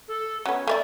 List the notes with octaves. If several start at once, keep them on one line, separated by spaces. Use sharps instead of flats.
A4
F#3 B3 C#4
A3 C#5 D5 E5